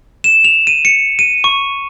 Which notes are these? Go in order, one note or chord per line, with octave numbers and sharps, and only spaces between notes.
E7
F7
D#7
C#7
D#7
C#6